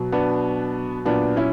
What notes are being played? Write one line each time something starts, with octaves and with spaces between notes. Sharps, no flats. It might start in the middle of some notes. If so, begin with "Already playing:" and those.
Already playing: B2 F#3
B3 D4
A#2 F#3 B3 D4
C#4 E4